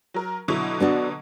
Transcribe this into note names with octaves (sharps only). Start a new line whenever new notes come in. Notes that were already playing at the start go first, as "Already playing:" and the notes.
F#3 A#4
B2 D3 F#3 E4
B3 D4 F#4